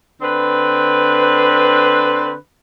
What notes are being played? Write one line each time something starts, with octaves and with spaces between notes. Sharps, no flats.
D3 C4 B4